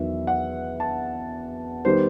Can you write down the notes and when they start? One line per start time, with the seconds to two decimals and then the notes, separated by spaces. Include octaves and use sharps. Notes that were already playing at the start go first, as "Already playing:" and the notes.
Already playing: E2 D#3 F#3 E5
0.27 F#5
0.80 A5
1.85 D#3 G3 B3 C5